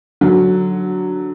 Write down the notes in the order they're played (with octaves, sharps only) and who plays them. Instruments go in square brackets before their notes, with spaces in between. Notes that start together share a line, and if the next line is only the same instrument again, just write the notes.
[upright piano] D3 F#3